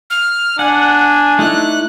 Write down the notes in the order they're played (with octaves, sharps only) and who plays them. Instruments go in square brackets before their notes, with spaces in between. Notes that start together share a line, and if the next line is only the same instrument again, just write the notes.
[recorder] F6
[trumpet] D4 [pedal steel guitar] F#5 [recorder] G#5
[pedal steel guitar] A3 D#4 E4 [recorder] F#6